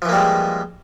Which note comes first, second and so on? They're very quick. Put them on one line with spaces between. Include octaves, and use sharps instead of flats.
F3 E3 A#3 G3 G#3